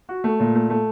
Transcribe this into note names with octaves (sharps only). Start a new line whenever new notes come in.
F#4
A3
A#2
A3
A3